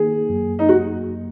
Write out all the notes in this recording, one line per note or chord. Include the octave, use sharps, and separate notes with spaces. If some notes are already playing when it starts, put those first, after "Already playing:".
Already playing: D#3 A#3 D#4 G#4
F#2 F#3 A#3
D#4
F#4